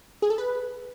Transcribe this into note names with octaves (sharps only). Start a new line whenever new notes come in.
G#4
A4
B4